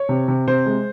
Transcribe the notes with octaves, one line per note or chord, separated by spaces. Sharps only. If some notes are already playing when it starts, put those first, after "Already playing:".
Already playing: C#5
C3
C3
C3 C5
G#3